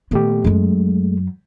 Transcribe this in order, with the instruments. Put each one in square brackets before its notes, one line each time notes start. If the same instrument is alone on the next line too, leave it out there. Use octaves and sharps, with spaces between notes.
[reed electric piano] A#2 A3 G4 [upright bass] D#3 B3
[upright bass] F#2 F#3 [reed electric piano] G#3 A3